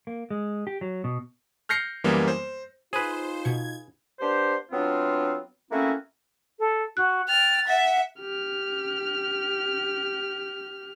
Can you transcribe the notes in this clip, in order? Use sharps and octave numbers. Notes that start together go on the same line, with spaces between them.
A#3
G#3
G4
F#3
B2
F6 G6 A#6 C7 C#7
F#2 E3 G3 A#3 B3
C5
D#4 F4 G#4 B4 C5
B2 G#6 C#7
B3 D4 G4 C5
F#3 B3 C4 D4 F4
A3 A#3 C4 C#4 E4 F#4
A4
F#4 F#6
G5 F6 A6
E5 F#5
G4 F6